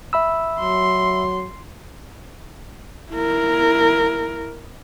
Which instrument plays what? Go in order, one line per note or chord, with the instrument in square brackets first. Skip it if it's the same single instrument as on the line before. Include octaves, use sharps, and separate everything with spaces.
[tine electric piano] E5 B5 E6
[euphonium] F#3 [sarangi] C6
[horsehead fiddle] E4 A#4